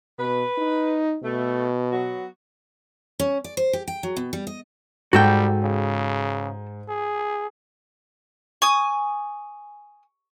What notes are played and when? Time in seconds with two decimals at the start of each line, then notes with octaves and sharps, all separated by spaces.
0.19 B2 B4
0.58 D#4
1.23 B2 A3
1.92 F#3 B3 F#4
3.20 C#4
3.44 D5
3.57 C5
3.73 G4
3.88 G5
4.03 F#3
4.17 B2
4.33 G3
4.47 D#5
5.13 G#2 G3 F#4 A4 G5
5.63 C#3
6.89 G#4
8.62 G#5 C#6 D#6